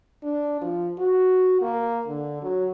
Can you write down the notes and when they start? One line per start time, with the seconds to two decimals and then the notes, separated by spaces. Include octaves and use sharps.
0.23 D4
0.61 F3
0.98 F#4
1.61 A#3
2.07 D3
2.42 F#3